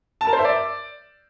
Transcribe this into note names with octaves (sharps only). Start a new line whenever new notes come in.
A5
A#4
C5
E5
D5